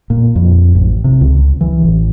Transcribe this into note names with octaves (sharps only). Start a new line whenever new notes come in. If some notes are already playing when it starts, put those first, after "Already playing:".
A#2
F2
A1
C3
C#2
E3
A1